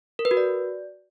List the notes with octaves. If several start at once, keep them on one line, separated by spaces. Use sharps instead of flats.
A#4
B4
F#4
D5